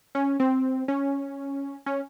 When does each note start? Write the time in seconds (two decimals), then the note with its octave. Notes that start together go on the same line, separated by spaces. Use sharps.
0.15 C#4
0.40 C4
0.88 C#4
1.86 C#4